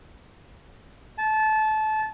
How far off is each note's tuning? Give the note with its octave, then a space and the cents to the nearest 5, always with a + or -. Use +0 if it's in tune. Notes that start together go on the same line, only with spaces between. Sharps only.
A5 -25